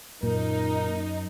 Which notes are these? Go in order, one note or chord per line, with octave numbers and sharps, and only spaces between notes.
F#2 A#2 D#4 A#4